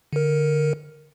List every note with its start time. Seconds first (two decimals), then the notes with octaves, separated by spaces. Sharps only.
0.13 D3 A#4